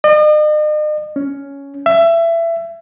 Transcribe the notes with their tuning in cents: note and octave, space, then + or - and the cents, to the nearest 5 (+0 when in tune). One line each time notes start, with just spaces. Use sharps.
D#5 -45
C#4 +10
E5 +25